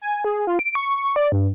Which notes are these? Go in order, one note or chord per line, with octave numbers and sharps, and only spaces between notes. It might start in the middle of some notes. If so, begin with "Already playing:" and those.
G#5
G#4
F4
D7
C#6
D5
G2